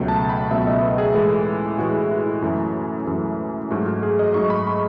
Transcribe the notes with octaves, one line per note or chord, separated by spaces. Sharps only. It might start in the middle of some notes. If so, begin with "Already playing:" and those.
Already playing: C#2 B2 F#3 A3
A5
A5
B5
C#2 B2 F#3 A3 E5
D#5
B4
G#4
A2 E3 G#3 A4
A2 E3 G#3 F#4
E4
F#4
E4
F#2 E3 A3
F#2 E3 A3
G#2 F#3 A3 F#4
F#4
G#4
D#5
G#2 F#3 A3 C#6
B5
B5